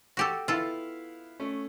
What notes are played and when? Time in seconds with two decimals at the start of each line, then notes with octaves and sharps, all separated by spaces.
0.17 F#4 G4 A4
0.48 B3 E4 F4 A4 F5
1.40 A3 C#4